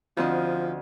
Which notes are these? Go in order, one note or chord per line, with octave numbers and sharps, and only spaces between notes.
D2 F3 C4 D#5